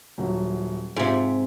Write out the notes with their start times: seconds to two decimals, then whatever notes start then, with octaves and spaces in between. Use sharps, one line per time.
0.18 D#1 F#3
0.96 G#2 C3 F4